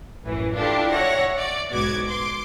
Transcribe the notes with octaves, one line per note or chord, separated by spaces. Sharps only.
A1 F#2 E3
D4 E4 F4 G4 A4
C#5 E5 F#5 A#6
D5
B1 G#2 B3 F#4 D6 G#6
C6 D6